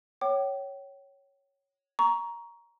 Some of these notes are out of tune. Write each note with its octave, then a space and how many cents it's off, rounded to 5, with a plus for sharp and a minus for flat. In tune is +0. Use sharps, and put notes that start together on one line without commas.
C#5 +0 G5 -35 D6 +25
A#5 +10 C#6 +20